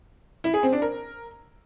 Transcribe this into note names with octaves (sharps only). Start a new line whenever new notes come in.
E4
G#4
C4
D4
A#4